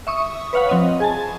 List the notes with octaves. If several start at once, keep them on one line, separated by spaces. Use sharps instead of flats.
E5 C#6 D#6
B4 C#5 F5 F#5 B5
F3 C4 D#5 D#7
G#4 G#5 A5